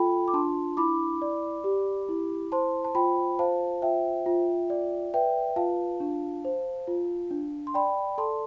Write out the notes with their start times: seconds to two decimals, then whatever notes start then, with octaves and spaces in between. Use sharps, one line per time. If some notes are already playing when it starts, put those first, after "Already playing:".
Already playing: F4 A4 G5 B5
0.28 D6
0.33 D4 A5 C6
0.77 E4 B5 D6
1.22 D5
1.64 G4
2.09 E4
2.52 C5 A5 C6
2.85 A5
2.95 F4 G5 B5
3.39 C5 F5 A5
3.82 F4 E5 G5
4.26 F4
4.70 D5
5.14 B4 E5 G5
5.56 F4 F5 A5
6.00 D4
6.45 C5
6.87 F4
7.31 D4
7.67 C6
7.74 D5 G5 B5
8.18 A4 A5 C6